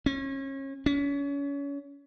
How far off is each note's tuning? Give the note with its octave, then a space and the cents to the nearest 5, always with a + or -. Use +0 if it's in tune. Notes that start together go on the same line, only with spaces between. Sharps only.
C#4 -30
C#4 +30